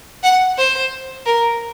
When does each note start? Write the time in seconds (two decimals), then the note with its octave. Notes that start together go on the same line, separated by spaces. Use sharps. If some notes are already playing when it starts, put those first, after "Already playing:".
0.23 F#5
0.58 C5
1.26 A#4